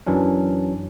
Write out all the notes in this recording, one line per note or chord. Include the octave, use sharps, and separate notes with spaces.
F#2 E3 F#3 C#4 D4